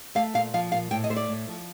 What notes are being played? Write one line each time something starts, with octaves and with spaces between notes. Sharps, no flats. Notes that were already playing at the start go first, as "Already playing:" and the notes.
A3 F5
A#2 F5
F3 F5
A#2 F5
A2 G5
D#5
A3 C5
D5
A2
F3